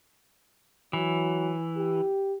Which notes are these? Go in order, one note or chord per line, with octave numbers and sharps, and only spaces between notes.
E3 F#3
G4